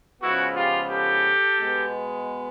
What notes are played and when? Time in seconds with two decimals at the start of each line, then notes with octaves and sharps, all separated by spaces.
0.21 C#3 F3 G#3 B3 E4 F#4
0.55 F4 G4
0.89 G4 A4
1.57 B2 G#3 B3